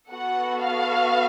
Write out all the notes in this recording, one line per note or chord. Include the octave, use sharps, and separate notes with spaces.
B3 F#4 A4 F#5
F5